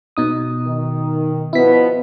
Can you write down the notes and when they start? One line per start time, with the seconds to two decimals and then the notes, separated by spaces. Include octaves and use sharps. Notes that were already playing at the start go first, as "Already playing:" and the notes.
0.17 B2 D#4 D#6
0.66 D#3
1.53 B2 F3 B3 E4 B6